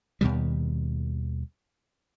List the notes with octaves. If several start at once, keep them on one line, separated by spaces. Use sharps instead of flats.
D#2 B2 D#3 G3